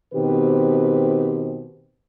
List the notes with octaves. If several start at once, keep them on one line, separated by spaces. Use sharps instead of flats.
B2 D#3 C4 G4 B4 C5